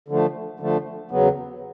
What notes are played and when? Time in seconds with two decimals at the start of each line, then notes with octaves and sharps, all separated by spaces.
0.08 D3 F3 A3
0.60 D3 F3 A3
1.11 E2 C#3 F#3 B3